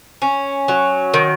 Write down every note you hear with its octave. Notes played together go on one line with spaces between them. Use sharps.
C#4
F#3
D#3